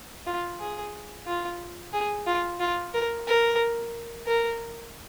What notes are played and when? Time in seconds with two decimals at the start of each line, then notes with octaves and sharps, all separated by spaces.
0.26 F4
0.60 G#4
1.27 F4
1.93 G#4
2.27 F4
2.60 F4
2.94 A#4
3.27 A#4
4.27 A#4